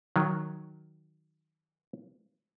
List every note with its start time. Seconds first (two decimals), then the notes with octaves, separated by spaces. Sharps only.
0.16 D#3 F#3